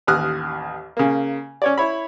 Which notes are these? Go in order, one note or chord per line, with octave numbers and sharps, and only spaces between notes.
A1 D#2 D#6 F6 F#6
C#3 A#3
C#4 C#5 D5
E4 C#5 B5